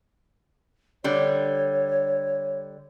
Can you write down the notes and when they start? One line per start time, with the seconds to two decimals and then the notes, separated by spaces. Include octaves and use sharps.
1.04 D3 G3 C#5